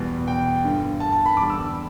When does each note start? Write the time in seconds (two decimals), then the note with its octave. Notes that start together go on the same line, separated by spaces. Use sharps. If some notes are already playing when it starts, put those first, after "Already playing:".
Already playing: E2 B2 G3
0.28 G5
0.64 G1 G2 D3
1.00 A5
1.12 A5
1.26 B5
1.37 E2 D3 G3 D6
1.50 E6